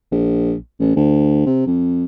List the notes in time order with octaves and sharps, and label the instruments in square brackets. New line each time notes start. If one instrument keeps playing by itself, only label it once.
[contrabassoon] A#1
A1
D2
C3
F2